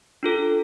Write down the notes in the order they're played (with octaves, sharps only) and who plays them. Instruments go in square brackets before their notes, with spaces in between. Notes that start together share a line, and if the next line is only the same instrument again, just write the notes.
[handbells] D4 F4 A4